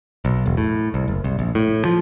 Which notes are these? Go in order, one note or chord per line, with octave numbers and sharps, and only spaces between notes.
B1
E1
A2
C2
F#1
C2
A#1
A2
F3